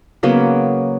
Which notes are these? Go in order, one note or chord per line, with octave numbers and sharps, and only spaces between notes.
C#3 F#3 A#3 B3